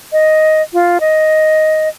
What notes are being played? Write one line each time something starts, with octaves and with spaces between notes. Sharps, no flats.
D#5
F4
D#5